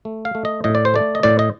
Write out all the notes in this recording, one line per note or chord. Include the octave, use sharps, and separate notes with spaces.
A3
F5
A3
D#5
A2 D#5
D5
C5
A3 D5
D#5
A2 D5
D#5